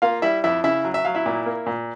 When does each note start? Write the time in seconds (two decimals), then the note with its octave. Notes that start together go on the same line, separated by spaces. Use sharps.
0.02 A#3 F4 F5
0.22 G3 E4 E5
0.44 F2 E4 E5
0.64 C#3 E4 E5
0.85 F#3
0.94 E5
1.05 F#3 F5
1.15 E4 E5
1.26 A#2
1.46 A#3
1.66 A#2